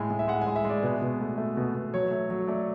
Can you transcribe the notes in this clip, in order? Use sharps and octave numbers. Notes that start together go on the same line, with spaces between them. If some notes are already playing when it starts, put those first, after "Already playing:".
Already playing: A2 G#3 G#5
A2
E5
G#3 F#5
G#5
G#3
E5
G#3 D5
B2 B4
B2
A3
A3
B2
B2
F#3 C#5
A3
F#3
A3 D5